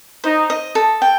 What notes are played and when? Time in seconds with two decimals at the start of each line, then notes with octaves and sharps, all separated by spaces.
0.24 D#4 C5
0.50 D#5
0.75 A4
1.02 G5